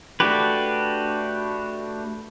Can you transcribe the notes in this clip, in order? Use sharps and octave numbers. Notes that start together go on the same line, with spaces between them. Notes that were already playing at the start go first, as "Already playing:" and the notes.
A3 D4 F#4 G4 B4